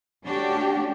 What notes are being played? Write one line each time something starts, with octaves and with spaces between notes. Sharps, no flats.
A3 C#4 D4 F#4 G4